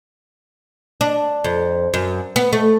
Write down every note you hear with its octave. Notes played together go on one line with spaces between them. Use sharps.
D4
F2
F#2
B3
A3